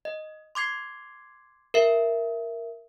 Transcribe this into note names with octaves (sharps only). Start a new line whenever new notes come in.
D#5
C6 D6 G#6 C7
A#4 E5